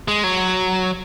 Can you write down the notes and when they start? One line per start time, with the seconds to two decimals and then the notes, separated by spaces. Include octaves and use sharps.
0.08 G#3
0.24 F#3